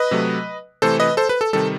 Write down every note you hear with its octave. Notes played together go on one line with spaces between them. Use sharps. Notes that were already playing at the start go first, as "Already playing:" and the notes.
Already playing: B4 D#5
C3 F#3 A3
C3 E3 A3 A4 C5
B4 D#5
A4 C5
B4
A4
C3 D#3 G3 A4